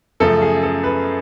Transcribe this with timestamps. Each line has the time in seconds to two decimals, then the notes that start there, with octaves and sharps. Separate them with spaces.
0.20 F#2 C#3 F3 A3 A4
0.42 G#4
0.63 A4
0.84 B4